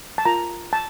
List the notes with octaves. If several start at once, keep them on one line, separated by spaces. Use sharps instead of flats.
A5
F4 A#4 A#5
A5